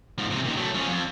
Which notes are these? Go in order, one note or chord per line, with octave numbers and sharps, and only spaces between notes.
G#2 F3
C3 E3
A#2 D#3
F#3 A3
F3 C#4
F2